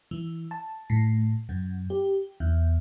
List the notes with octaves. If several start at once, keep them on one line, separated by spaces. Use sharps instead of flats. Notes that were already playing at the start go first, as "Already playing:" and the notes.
E3
A5
A2
F#2
G4
E2